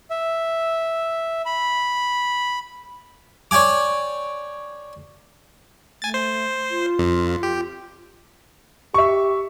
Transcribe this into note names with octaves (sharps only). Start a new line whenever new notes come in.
E5
B5
C#5 D5 G5 G#5 D6
A3 G#5 A6
C5
F4
F2
G4
G4 E5 C#6